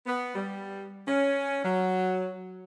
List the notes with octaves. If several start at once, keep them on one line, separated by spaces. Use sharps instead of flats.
B3
G3
C#4
F#3